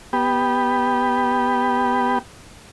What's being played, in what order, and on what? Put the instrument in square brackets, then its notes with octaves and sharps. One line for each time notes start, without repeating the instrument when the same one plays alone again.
[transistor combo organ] B3 G4